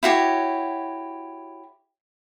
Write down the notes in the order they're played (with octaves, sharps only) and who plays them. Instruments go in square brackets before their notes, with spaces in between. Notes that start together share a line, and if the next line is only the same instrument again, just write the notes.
[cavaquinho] E4 F#4 G4 C#5